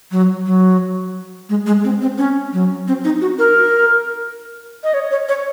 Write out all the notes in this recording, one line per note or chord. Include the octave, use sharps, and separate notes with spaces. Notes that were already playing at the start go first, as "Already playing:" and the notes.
F#3
F#3
G#3
G#3
C4
C4
C#4
F#3
C4
D#4
F#4
A#4
D#5
C#5
C#5
C#5